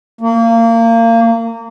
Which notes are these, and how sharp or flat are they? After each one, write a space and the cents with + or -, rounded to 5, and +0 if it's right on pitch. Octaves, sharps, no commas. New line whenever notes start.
A#3 -25